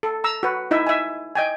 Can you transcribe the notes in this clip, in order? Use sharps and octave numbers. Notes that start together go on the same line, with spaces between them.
A4
A#5 E6
F#4 B4
D#4 E4 D#5 E5
E5 G#5
D#5 G5 G#5